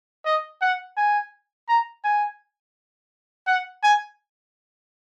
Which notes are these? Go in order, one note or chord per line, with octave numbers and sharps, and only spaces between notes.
D#5
F#5
G#5
A#5
G#5
F#5
G#5